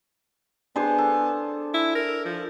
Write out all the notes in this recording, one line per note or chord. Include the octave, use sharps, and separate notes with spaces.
B3 D4 G#4 C5
A4
E4
A#4
F3